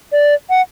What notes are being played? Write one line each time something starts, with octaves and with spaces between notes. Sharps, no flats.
D5
F#5